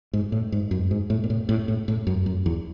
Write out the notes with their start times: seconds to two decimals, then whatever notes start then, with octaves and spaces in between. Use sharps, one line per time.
0.13 G#2
0.32 A2
0.52 G#2
0.71 F#2
0.91 G#2
1.10 A2
1.24 A#2
1.30 A2
1.49 A2
1.68 A2
1.88 A2
2.07 F#2
2.26 F#2
2.46 E2